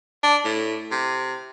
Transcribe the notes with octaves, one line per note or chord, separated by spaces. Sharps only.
D4
A2
C3